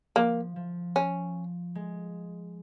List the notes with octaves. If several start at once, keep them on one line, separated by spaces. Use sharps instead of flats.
F3 A#3
F3
C#4
G#3